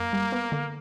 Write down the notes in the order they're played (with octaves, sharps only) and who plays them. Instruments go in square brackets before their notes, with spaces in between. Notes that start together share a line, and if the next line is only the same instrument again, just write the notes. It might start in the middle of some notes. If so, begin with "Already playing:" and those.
Already playing: [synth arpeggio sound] F#2 [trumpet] A#3
[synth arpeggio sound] G3
B3
D3